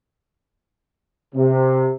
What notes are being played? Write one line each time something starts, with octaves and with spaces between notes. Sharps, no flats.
C3